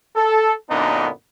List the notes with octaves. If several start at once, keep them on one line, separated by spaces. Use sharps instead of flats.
A4
F#2 A#2 D3 B3 D4 D#4